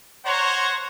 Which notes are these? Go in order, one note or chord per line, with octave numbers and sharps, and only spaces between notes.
C5 C#5 F#5 A#5 C6 C#6